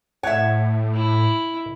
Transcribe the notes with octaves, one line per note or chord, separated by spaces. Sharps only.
A2 C#5 E5 F#5
E4